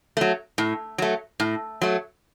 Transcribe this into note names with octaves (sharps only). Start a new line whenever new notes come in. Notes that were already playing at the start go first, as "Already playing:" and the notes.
F#3 A3
A2
F#3 A3
A2
F#3 A3